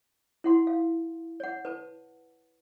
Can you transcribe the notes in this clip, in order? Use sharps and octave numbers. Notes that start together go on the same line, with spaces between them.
E4 F#5 C6
F5
C#5 F#5
B4 A5